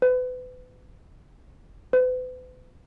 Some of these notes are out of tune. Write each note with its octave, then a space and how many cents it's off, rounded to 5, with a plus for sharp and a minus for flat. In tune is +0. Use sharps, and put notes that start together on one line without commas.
B4 +35
B4 +40